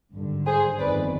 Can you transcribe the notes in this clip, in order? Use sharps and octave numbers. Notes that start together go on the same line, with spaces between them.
G#1 G2 D3
G#4 C5
G1 F2 D#3 B4 D5